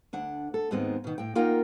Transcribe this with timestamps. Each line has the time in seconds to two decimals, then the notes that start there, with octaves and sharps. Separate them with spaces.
0.13 D2 D4 F#5
0.54 A4
0.71 D#2 G#2 D#3 G#3 B3 C4
1.04 B2 D#3
1.18 A2 G5
1.35 A#3 D#4 F4 A#4 F#5 G5